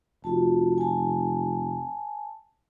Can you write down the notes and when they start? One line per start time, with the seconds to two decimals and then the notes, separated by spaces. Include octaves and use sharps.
0.24 F1 F4 F#4 A5
0.78 G#5 A5